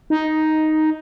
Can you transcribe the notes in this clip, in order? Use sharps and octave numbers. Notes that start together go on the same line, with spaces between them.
D#4